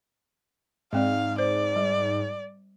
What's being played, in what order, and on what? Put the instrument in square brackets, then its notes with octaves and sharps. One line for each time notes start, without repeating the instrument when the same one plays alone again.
[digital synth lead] G#2 [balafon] G#3 C4 D5 [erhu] F5
[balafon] C5 [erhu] D5
[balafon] G3